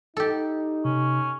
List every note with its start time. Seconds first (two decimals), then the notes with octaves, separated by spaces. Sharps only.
0.17 D#4 G4 A4
0.85 C3 C#4